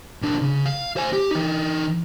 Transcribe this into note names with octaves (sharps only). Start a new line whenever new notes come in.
B1 D4
C#3
F5
C5 G#5
G4
E3 D#4